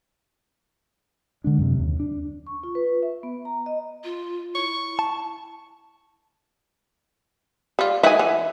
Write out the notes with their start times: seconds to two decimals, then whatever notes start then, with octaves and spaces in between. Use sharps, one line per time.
1.44 D3 G#3 D4
1.58 F#2 C3
1.79 D#2
2.00 D4
2.47 C#6
2.63 F4
2.75 B4
3.03 E5
3.23 B3
3.45 A#5
3.66 D#5
4.04 F4
4.55 E4 C#6
4.99 A5
7.79 G3 F4
8.03 D#3 G#3 F#4 E5 G#5
8.19 E3